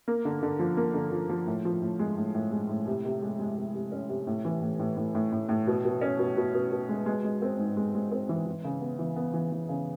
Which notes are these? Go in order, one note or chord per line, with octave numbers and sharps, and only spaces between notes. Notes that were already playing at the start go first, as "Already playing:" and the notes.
A#3
D3
D3
F3
A#3
D3
F3
F3
A2
F3
A2
G#3
A2
A2
G#3
A2
C3
C3
G#3
G#3
C3
C3
C#4
C3
A2
E3
A2
A2
A2
A2
A2
A2
B2
B2
C#4
B2
B2
B2
B2
G#3
G#3
G#3
C4
G#2
G#3
G#3
C4
E3
E3
C#3
B3
E3
B3
E3
E3
C#3